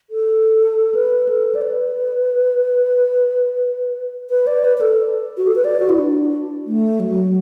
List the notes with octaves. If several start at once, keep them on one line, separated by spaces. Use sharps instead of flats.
A4
B4
A4
D5
B4
B4
D5
B4
B4
A4
F#4
A4
B4
D5
F#4
E4
D4
A3
F#3